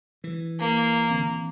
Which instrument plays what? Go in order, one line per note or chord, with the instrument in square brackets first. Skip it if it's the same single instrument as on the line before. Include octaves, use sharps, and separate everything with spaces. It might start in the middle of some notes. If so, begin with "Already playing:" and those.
[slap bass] E3
[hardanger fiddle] A#3
[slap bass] D3 E3 C4